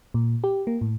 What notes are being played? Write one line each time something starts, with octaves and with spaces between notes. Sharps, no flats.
A#2
G4
A#3
A2